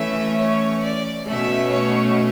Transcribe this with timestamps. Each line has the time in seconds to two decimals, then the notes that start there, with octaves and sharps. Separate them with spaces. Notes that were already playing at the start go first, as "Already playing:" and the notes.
Already playing: E3 A3 C#4 E5
0.39 C#5
0.83 D5
1.27 B2 A3 C#4 E5
1.71 C#5